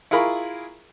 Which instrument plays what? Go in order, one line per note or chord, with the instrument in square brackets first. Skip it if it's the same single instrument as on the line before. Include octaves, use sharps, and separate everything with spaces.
[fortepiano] E4 F4 G#4 A#4 B5 C#6